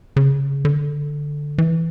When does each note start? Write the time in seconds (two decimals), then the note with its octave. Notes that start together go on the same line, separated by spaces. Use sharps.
0.16 C#3
0.65 D3
1.58 E3